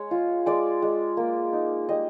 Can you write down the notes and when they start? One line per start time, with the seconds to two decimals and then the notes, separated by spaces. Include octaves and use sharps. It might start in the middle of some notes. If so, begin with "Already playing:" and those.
Already playing: G#3 C#5
0.11 F4
0.46 G#3 D5
0.82 G#3
1.17 A#3
1.53 D#4
1.89 G3 D#5